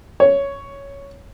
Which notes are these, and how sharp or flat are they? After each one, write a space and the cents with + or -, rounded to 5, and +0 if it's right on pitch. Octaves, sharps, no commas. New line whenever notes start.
C#5 +5